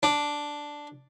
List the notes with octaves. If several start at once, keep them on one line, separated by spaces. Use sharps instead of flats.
D4